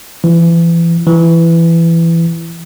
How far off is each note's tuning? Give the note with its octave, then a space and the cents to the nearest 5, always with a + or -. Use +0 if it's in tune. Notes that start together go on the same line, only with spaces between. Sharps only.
E3 +30
E3 +15